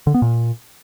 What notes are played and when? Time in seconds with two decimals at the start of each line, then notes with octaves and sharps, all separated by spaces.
0.07 D3
0.14 B3
0.22 A#2